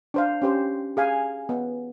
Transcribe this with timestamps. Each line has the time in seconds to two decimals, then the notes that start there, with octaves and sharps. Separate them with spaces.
0.14 D4 C5 F5
0.42 C#4 G4 C5
0.97 G#4 F5 G#5
1.49 B3